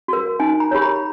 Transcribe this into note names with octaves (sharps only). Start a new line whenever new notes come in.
F#4 A#4
D#4 G#5
A#5
G4 A#4 C#5 B5
A#5